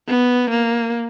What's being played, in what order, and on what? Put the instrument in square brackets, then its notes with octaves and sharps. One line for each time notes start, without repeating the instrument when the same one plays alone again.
[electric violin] B3
A#3